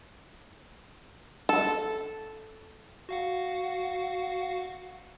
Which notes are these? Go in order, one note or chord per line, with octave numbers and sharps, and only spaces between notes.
A4
F#4 F5 F#5